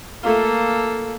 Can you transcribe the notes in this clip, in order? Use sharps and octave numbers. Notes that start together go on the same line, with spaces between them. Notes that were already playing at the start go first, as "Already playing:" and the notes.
A3 A#3 F4 A4